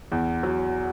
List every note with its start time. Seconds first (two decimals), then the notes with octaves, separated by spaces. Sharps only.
0.12 E2
0.43 F#3